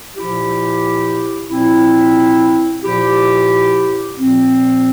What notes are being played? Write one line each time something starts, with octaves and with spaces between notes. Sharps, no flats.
A#2 F3 E4 G4
A#2 F3 C4 E4
A#2 F3 E4 G4
A#2 F3 C4